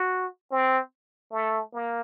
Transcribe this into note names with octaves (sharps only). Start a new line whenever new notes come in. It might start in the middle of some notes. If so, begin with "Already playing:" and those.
Already playing: F#4
C4
A3
A#3